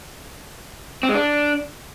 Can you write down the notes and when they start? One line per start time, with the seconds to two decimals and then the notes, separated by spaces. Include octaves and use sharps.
1.03 C4
1.09 G#3
1.15 D4